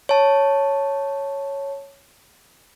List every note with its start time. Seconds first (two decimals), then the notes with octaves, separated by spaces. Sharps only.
0.09 C#5 A5